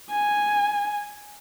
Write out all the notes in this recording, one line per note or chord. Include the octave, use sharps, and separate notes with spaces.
G#5